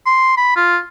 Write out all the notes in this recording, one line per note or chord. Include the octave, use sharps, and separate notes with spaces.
C6
B5
F4